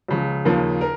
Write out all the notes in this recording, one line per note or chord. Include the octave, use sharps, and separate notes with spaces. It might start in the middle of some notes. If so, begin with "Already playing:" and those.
C#2 C#3 F3
D#2 C#3 F3 A#3
A#4